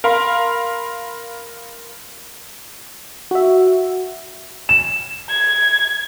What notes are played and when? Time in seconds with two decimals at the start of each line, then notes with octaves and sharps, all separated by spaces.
0.04 A#4 F5 B5 C6
3.31 F#4 E5
4.69 E7
5.30 G#6